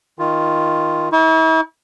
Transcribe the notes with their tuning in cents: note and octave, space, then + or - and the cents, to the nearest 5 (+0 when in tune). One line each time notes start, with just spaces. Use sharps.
D#3 +15 F4 +0
E4 -40 C#6 +35